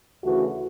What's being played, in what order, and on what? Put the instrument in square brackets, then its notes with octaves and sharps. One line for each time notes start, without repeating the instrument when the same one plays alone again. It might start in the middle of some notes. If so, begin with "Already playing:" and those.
[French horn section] D2 C#3 E3 A3 F#4